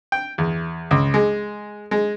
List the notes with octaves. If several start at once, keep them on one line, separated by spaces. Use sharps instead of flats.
G5
E2
C#2
G#3
G#3